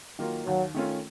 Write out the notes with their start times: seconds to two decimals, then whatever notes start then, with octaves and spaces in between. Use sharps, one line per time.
0.19 D#3 F#3 A#3 F4
0.46 D#2 F#3
0.74 D#3 A3 C#4 F4